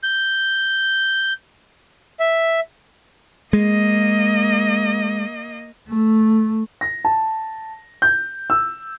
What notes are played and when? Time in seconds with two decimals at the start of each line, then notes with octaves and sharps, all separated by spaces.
0.03 G6
2.20 E5
3.53 G#3 A#3 D#5
5.89 A3
6.81 A#6
7.05 A5
8.02 G6
8.50 E6